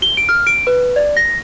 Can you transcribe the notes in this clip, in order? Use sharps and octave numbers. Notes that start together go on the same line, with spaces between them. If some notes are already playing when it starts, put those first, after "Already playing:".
G7
D7
F6
D7
B4
D5
A#6